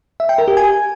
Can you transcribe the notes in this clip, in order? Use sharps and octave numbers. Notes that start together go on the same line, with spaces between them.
E5
G5
A#4
G4
G#5